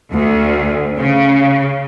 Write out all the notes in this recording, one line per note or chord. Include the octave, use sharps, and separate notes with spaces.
D2
C#3